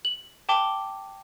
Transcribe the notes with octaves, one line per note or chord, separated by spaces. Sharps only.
F#7
G5 A5 D6 G7